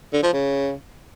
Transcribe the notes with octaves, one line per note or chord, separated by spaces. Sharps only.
D3
F3
C#3